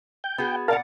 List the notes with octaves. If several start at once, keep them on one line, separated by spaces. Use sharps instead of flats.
G5
B3 F#4 G#4
A#2 A#4 D5 F5 F#5 A5